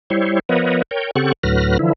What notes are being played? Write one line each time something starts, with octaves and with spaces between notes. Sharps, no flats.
G3 E4 C5 C#5
F3 B3 A#4 B4 C#5 D#5
A#4 C#5 G5
C#3 C4 G4 A4 F#5 C#6
D2 A2 F#3 B4 F6 A#6
D3 E3 F3 E4